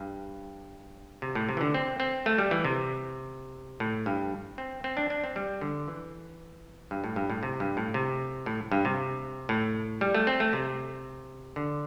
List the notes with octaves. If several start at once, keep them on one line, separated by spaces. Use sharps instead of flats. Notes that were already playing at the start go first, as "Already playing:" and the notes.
Already playing: G2
C3
A2
C3
E3
D3
C4
C4
A3
G3
E3
C3
A2
G2
C4
C4
D4
D4
C4
G3
D3
E3
G2
A2
G2
A2
C3
G2
A2
C3
A2
G2
C3
A2
G3
A3
C4
A3
C3
D3